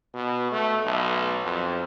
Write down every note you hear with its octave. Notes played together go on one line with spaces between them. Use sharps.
B2
A3
B1
F2